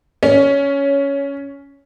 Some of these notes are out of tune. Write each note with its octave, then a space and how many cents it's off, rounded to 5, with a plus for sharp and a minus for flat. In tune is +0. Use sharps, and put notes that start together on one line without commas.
C#4 +10